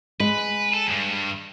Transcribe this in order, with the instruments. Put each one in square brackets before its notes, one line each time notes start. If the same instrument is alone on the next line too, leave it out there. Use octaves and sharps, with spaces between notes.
[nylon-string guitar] G#3 [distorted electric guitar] B4
[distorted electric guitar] A4
E2 G2